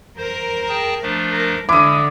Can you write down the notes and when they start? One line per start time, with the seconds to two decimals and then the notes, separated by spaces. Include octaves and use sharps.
0.18 A#4 C5
0.69 G#4 G5 A5
1.02 F3 A3 D4
1.32 A#4
1.69 D3 G#3 E4 D6 D#6